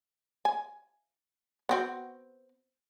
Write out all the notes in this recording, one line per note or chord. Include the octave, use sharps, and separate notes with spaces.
G#5
B3 C4 F#4